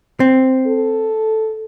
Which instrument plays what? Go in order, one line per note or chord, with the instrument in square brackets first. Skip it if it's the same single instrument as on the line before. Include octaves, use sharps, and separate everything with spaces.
[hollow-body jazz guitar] C4
[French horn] A4